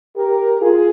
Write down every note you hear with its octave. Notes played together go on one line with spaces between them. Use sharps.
G4 A#4
F4 G#4